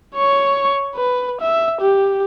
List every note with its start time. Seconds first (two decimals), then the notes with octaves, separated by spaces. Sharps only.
0.16 C#5 C#6
0.95 B4
1.41 E5
1.81 G4